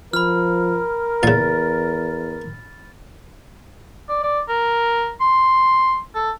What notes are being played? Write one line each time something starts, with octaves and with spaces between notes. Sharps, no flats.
F3 A#4 B5 F6
E2 A#2 C#3 A6
D5
D5
A#4
C6
A4